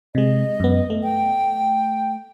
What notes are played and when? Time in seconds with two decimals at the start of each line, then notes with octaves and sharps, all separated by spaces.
0.15 C3 G#3 D#5
0.60 F#2 B3
0.90 A3
1.03 G5